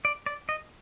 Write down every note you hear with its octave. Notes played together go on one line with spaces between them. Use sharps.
D5
D5
D#5